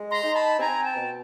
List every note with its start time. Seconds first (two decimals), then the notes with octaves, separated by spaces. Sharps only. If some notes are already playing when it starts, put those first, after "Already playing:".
Already playing: G#3
0.11 A#5 C6
0.23 D#4
0.35 A5 B5
0.59 C4 G#5 A#5
0.84 G5 A5
0.97 B2